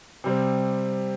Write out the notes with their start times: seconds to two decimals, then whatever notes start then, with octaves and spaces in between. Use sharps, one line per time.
0.24 C3 G3 C4